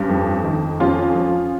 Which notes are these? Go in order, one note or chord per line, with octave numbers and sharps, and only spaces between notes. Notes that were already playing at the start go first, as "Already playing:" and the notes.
Already playing: G2 C#4
F2
D#3
F2 C#4 F4
F3